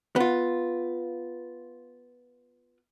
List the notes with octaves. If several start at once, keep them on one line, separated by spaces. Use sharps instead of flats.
B3 F4